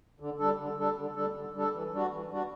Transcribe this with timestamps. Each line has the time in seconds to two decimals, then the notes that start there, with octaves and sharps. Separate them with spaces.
0.20 D3
0.39 G3 D4 A4
0.59 D3
0.78 G3 D4 A4
0.96 D3
1.16 G3 D4 A4
1.35 D3
1.54 G3 D4 A4
1.73 E3
1.92 G3 D4 F#4
2.12 E3
2.31 G3 D4 F#4